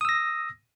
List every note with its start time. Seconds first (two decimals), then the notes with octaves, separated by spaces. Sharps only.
0.01 D#6
0.05 E6
0.09 A#6